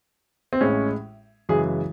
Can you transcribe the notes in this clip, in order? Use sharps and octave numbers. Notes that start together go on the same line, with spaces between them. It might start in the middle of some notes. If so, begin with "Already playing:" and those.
C4
A1 A2 G#3 C#4
F#2 C#3 E3 G#3 G#4